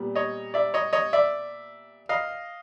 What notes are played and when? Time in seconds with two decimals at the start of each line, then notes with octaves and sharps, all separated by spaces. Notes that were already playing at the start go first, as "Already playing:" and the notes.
Already playing: A#2 G3 B3
0.15 C#5 D#5
0.54 D5 E5
0.74 C#5 D#5
0.93 C#5 D#5
1.13 D5 E5
2.09 D#5 F5